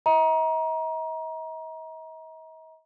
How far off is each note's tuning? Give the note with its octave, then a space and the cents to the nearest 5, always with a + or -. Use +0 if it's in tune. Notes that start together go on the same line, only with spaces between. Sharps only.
D#5 +45 A#5 +25